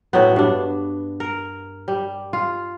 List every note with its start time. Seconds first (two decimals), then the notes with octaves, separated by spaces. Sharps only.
0.13 A2 F#3 B3
0.36 G2 D4
1.20 A#4
1.88 G3
2.33 F4